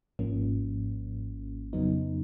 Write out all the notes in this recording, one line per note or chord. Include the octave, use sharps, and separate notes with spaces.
G#1 G#2 F3 A#3 C#4
F2 C#3 F#3 B3 D#4